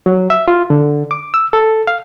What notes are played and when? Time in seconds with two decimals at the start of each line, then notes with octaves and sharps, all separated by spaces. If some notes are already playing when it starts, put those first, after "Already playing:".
0.06 F#3
0.30 E5
0.48 F4
0.70 D3
1.11 D6
1.34 E6
1.53 A4
1.87 F5